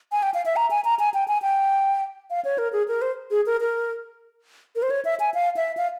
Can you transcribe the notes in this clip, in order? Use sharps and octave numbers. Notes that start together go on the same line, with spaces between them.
G#5
G5
F5
E5
A#5
G#5
A#5
G#5
G5
G#5
G5
F5
C#5
A#4
G#4
A#4
C5
G#4
A#4
A#4
A#4
C5
C#5
E5
G#5
F5
E5
F5